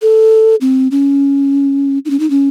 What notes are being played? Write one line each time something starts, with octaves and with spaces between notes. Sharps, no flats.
A4
C4
C#4
D#4
C#4
D#4
C#4